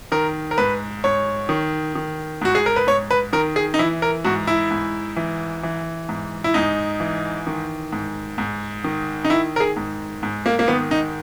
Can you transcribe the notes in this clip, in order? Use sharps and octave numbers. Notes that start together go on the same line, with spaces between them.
D#3 A#4
A#4
G#2 B4
G#2 C#5
D#3
D#3
G#2 F#4
G#4
A#4
B4
G#2 C#5
B4
D#3 A#4
G#4
D#4
E3 E4
A#4
G#2 F#4
E4
G#2
E3
E3
G#2
E4
G#2 D#4
E3
D#3
G#2
G#2
D#3
D#4
D#3 E4
A#4
G#4
G#2
G#2
A#3
A#3
D#3 B3
D#4